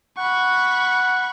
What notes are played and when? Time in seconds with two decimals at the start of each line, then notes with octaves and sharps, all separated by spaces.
0.18 F#5 B5 C#6